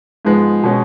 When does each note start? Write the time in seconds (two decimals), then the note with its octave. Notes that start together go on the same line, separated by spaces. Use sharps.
0.25 G#2 F3 G#3 B3
0.63 B2 G#3 C#4